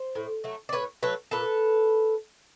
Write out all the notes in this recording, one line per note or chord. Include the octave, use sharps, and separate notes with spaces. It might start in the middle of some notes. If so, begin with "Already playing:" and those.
Already playing: C5
A2
F#3 A3
D5
A2 B4 C#5
F#3 A3 B4 C#5
A#2 A4 B4